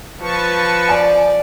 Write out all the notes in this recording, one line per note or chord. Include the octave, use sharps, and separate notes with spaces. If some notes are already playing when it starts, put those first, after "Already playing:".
F3 B4 A5 C#6
D5 G#5